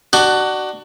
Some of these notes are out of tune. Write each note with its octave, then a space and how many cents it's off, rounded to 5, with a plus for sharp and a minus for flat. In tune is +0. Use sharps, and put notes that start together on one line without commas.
D4 +25 F#4 +25